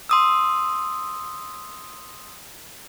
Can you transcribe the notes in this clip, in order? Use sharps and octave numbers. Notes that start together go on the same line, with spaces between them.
C6 D#6 E6